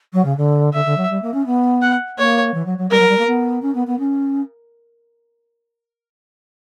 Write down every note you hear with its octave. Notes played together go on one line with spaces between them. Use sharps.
F#3
C#3
D3
D3 E5
D3
F#3
G3
A#3
C#4
B3
F#5
A#3 C#5
E3
F#3
F#3
G3 A#4
F#3
G3
A#3
B3
C#4
B3
B3
C#4